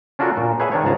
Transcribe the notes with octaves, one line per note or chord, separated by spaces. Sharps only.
C#4 D4 F4 F#4 A4 A#4
A#2
G#4 B4 C#5 E5 F#5 G#5
D#3 D4 C#5
C#2 G#2 G#4 A5 A#5